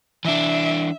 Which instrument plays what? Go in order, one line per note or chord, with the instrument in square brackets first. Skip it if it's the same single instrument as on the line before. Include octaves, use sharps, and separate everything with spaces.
[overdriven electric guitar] E3 D4 [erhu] E5